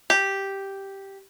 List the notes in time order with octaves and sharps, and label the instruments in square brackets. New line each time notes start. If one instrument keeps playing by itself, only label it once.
[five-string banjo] G4